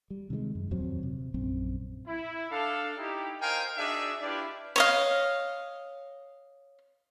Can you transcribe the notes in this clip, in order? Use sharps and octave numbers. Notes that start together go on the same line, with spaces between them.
G3
C3 D#3 F3 G#3
F#2
D#1 F2 F#3 C4
C3
A#1 F#2 C4
E4
D4 A4 F5
D#4 E4 G4
A#4 C5 D#5 F5 G5 G#5
D4 D#4 F#4 G#4 D5 E5
D4 E4 F4 G4 B4 D5
C#5 D#5 F5